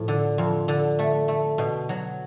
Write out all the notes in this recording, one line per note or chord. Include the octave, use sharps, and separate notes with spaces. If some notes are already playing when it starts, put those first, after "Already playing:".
Already playing: A2 F3
D3
F2
D3
A3
A3
B2
F#3